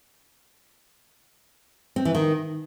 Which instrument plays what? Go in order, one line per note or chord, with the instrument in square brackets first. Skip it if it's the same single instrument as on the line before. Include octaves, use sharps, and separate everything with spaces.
[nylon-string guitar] C4
E3
D#3